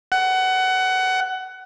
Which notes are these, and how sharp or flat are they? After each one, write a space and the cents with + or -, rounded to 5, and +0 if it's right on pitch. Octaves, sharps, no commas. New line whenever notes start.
F#5 +20